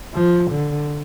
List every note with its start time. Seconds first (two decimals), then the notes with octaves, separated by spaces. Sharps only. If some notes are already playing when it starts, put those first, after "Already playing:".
0.14 F3
0.51 D3